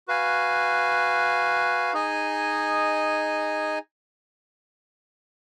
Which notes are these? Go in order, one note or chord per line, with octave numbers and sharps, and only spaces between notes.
F#4 B4 F5 G#5
D#4 G#4 D#5 G#5